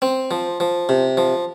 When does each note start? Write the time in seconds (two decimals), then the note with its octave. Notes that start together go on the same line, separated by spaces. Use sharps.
0.02 C4
0.31 F3
0.60 F3
0.89 C3
1.17 F3